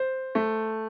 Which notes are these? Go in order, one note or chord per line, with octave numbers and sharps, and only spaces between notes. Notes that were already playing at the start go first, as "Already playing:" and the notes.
Already playing: C5
A3